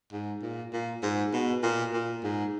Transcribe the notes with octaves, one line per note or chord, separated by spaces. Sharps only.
G#2
A#2
A#2
G#2
B2
A#2
A#2
G#2